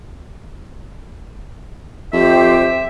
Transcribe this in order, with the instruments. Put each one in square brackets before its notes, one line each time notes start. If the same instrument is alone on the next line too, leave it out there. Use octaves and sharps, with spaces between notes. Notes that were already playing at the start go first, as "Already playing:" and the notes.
[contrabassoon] F2 [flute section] G4 C5 [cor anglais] E5